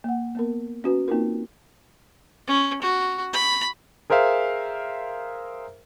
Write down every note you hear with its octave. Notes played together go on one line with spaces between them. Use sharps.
A#3 F#5
A#3 B3 A#4
C#4 F#4 B4
A#3 C4 D#4 F4 A#4
C#4
F#4
B5
G#4 A#4 C5 E5 F5